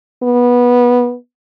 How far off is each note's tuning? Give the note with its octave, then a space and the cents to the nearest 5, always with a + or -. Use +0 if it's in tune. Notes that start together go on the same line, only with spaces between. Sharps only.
B3 -15